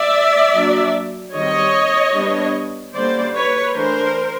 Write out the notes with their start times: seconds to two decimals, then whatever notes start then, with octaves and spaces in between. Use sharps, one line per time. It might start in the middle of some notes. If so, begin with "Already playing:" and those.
Already playing: D5 E5
0.54 F#3 A#3 D4
1.34 D#3 G3 C4 C#5 D#5
2.14 G3 B3 D4
2.93 D3 G3 A#3 C#4 C5 D5
3.34 B4 C#5
3.74 E3 A3 D4 A#4 C5